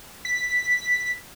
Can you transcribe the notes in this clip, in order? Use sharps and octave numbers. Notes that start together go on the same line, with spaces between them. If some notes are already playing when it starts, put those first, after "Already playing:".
B6